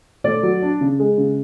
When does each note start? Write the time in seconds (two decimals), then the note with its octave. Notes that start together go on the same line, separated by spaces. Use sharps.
0.24 A3 D5
0.43 F#3
0.62 D4
0.81 C#3
0.99 G#3
1.18 C#3